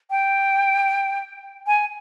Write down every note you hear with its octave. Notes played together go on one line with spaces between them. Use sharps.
G5
G#5